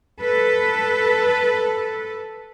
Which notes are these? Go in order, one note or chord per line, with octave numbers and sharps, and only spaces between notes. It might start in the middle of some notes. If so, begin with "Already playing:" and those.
A4 B4